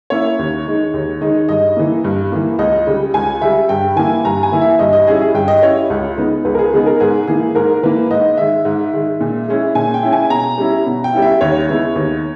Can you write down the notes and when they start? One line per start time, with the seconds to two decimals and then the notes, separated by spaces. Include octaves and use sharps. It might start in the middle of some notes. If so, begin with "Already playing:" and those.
0.10 A#3 C#4 E4 C#5
0.39 D#2
0.65 D#3 G#3 D#4
0.94 D#2
1.21 D#3 G#3 D#4
1.49 G2 D#5
1.76 E3 A#3
2.04 G2
2.32 E3 A#3
2.59 C#2 D#5
2.87 C#3 G3
3.14 C#2 G#5
3.41 C#3 G3 E5
3.69 G2 G5
3.96 E3 A#3 E4 G#5
4.25 G2 A#5
4.43 G#5
4.52 E3 A#3 E4
4.61 E5
4.79 G2 D#5
4.93 D#5
5.07 G3 C#4 E4 G#4
5.21 G#4
5.34 G2 G5
5.48 D#5
5.62 G3 C#4 E4 C#5
5.90 C#2
6.17 C#3 G#3 B3 D#4
6.45 C#2 B4
6.55 A#4
6.59 G#4
6.73 C#3 G#3 B3 D#4 G#4
6.86 A#4
7.00 G#2 G#4
7.27 E3 A#3 G#4
7.55 G#2 A#4
7.83 E3 A#3 B4
8.11 G#2 D#5
8.37 D#3 G#3 E5
8.65 G#2
8.93 D#3 G#3
9.21 A#2
9.48 G#3 C#4 E4
9.75 A#2 G#5
9.94 G5
10.03 G#3 C#4 E4
10.13 G#5
10.30 B2 A#5
10.58 G3 C#4 E4
10.87 B2
11.04 G5
11.13 G3 C#4 E4
11.22 E5
11.41 D#2 C#5
11.69 C#3 G#3 B3 E4
11.96 D#2